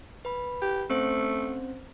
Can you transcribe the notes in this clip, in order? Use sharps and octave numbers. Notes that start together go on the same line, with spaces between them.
B4 B5
G4
A3 C4 C#4 C5